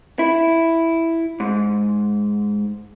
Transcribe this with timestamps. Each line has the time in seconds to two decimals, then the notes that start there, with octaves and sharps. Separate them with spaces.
0.19 E4
1.40 G#2